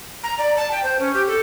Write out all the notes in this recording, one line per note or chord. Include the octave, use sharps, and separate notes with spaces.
A#5
D5
A5
G5
C5
C#4
G4
A4